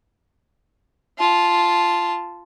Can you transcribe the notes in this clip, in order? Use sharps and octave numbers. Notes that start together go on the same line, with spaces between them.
F4 A5